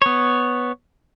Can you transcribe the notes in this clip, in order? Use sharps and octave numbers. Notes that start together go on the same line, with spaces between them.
B3 C#5